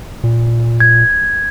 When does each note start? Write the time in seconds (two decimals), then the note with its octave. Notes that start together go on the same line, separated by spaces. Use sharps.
0.24 A#2
0.80 G#6